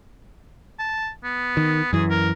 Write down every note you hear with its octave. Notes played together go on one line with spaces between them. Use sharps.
A5
B3
D#3
F#2 E3 G#4
A#4